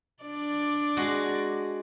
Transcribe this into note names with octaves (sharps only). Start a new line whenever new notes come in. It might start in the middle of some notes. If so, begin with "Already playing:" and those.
D4 D5
G#3 F#4